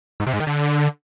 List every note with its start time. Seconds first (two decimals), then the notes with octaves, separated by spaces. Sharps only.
0.20 G#2
0.27 C3
0.33 G#2
0.40 D#3
0.47 D3